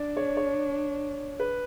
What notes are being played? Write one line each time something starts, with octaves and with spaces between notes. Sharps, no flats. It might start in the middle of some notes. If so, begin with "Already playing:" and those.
Already playing: D4 D5
C#5
C#5
B4